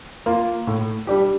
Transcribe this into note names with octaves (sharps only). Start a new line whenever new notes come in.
A#3 F4
A2
G3 D4 G4